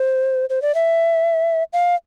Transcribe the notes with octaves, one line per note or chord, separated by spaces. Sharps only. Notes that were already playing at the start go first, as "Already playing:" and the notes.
Already playing: C5
C5
D5
E5
F5